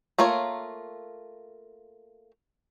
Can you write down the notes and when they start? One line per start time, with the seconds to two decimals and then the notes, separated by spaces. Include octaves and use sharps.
0.19 A3 A#3 F4 A#4 C#5